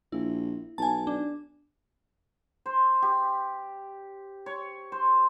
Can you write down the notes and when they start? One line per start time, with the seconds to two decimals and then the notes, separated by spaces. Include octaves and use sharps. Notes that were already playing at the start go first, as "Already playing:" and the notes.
0.12 A#1 E4
0.78 B1 G#5 A5
1.07 D4
2.66 C5
3.02 G4
4.46 C#5
4.92 C5